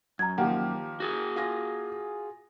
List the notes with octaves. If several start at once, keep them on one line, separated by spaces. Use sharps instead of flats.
F#2 A#5 G#6
D#3 F3 A#3 G4 F#5
F#4 G#4
F4 G#5 A#6